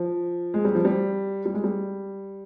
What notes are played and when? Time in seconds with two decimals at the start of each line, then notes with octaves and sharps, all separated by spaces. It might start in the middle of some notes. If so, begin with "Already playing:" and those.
Already playing: F3
0.54 G#3
0.65 G3
0.75 F3
0.85 G3
1.46 G3
1.54 G#3
1.64 G3